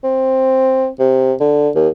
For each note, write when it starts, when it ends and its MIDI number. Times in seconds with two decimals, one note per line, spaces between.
0.04 0.88 60
1.00 1.34 48
1.40 1.70 50
1.75 1.89 39